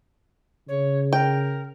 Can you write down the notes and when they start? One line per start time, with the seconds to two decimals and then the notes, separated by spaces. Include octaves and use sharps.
0.68 C#3 C#5
1.13 A#4 G5